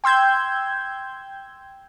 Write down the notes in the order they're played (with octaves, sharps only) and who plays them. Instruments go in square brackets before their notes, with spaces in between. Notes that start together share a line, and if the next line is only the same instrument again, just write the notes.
[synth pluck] G5 C6 E6 G6 G#6